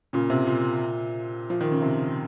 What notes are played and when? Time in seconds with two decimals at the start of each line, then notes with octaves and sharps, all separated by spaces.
0.13 A#2 C#3
0.30 C3
0.47 A#2
1.50 F3
1.61 D#3
1.72 C#3
1.82 C3